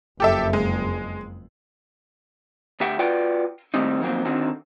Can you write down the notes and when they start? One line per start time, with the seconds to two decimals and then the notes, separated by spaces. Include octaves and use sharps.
0.20 F#1 F2 G4 A4 E5
0.53 G#3
2.80 D2 G4 E5 F#5 G5
2.99 F4 F#4 B4 D5 F#5 G5
3.74 D#2 A2 D#3 G3 C4 D#4
4.01 B2 D#3 F3 F#3 A#3 C4
4.25 D3 D#3 C4 F#4